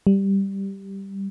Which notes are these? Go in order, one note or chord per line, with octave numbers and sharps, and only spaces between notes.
G3